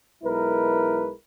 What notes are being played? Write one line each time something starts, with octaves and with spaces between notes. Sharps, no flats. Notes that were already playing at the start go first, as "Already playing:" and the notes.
B1 G#3 E4 A#4 B4